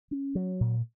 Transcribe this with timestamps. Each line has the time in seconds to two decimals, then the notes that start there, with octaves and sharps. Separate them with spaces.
0.11 C#4
0.35 F#3
0.60 A#2